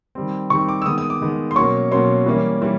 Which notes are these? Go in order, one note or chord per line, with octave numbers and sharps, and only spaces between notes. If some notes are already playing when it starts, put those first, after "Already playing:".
D#3 G3 C4
D#3 G3 C4 C#6
D6
E6
D#3 G#3 B3 D#6
D#6
D6
D#3 G#3 B3
C6
B2 F#3 A#3 C#4 C#6
B2 F#3 A#3 C#4 C6
E3 G3 A#3 C#4
E3 G3